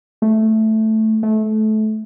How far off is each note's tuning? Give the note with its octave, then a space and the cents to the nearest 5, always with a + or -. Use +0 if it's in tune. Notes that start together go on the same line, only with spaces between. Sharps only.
A3 -5
A3 -25